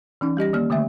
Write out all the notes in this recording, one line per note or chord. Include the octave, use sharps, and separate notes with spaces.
E3 C#4 D#4
G3 G4 D#5 A#6
D#3 A#3 F6
D3 D#3 A3 E5